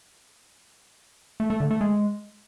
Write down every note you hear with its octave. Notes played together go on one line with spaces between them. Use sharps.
A3
A3
D3
A3
G#3